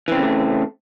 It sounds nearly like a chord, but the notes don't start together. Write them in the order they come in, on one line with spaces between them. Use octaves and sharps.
E3 C4 C#3 A#3 A3